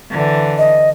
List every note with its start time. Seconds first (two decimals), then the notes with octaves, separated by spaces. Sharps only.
0.11 D3 E3
0.58 D#5